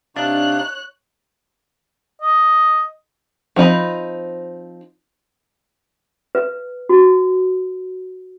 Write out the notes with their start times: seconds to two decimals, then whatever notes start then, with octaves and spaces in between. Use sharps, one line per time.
0.16 C3 D4 D#4 C#5 F5 F#6
2.22 D#5
3.56 F3 C4 D#4 B5
6.35 B4
6.89 F#4